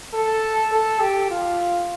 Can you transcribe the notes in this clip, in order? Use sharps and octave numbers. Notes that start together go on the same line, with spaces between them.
A4
A4
G4
F4